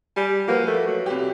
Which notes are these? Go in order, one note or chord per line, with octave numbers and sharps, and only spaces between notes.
G3 G#5
F3 A#3 F#4 B4
A3
F#3
C2 G4